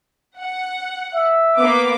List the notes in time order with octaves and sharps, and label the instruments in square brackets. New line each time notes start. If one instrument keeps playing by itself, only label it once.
[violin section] F#5
[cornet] E5
[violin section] A#3 B3 D6